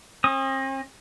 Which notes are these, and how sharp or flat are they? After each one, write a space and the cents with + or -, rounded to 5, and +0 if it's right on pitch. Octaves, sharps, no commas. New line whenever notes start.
C4 +45 D#6 -5